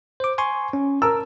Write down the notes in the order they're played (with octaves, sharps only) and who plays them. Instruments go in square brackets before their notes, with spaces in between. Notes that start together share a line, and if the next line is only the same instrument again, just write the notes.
[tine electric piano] C5 D6
G#5 C6 C#6
C#4
[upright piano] A#4 E6 [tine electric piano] A5